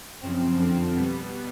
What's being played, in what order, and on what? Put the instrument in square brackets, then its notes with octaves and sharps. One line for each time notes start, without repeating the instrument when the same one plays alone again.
[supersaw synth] F#2 C#3 F3 C4
F2 D3 F3 C4
B2 G3 B3